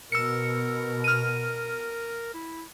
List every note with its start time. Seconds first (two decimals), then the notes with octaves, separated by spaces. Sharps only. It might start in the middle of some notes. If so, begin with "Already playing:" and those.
0.12 B2 A#4 E6 C#7
1.04 F6 D#7
2.34 E4